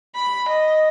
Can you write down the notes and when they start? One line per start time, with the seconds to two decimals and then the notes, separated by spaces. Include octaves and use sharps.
0.15 B5
0.49 D#5